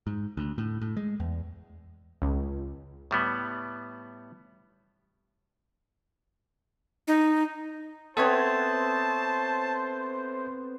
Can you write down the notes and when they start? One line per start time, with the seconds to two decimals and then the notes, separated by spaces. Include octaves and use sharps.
0.07 G#2
0.37 D2
0.58 A2
0.81 A2
0.97 G#3
1.20 E2
2.22 C#2
3.11 A2 G3 B3
7.08 D#4
8.17 B3 C4 A4 C5 C#5 E5 A5 G#6